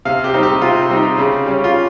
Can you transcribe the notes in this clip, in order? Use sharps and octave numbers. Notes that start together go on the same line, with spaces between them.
C3 F5
G4
G3 C4 D#4
G4
C3 F4
G3 C4 D#4
C#3
G3 C#4
F4